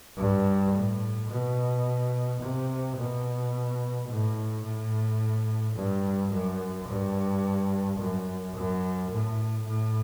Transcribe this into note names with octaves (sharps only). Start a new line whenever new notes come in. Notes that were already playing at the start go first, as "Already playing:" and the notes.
G2
A2
B2
C3
B2
A2
A2
G2
F#2
G2
F#2
F#2
A2
A2